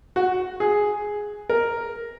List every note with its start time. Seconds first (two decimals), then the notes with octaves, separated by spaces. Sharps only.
0.16 F#4
0.60 G#4
1.49 A#4